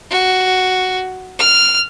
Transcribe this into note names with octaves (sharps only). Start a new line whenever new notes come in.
F#4
F6